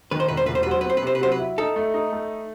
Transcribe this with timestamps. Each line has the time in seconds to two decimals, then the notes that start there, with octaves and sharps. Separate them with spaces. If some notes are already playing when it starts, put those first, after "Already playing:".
0.11 D#3 B4
0.20 C5
0.28 E1 B4
0.37 C5
0.46 E1 B4
0.55 C5
0.63 B4
0.66 F#3 C5
0.81 B4
0.85 C4
0.90 C5
0.97 B4
1.02 C3 C5
1.15 B4
1.21 F#3 C5
1.32 B4
1.39 E4
1.58 D#4 A4
1.76 A3
1.94 D#4
2.13 A3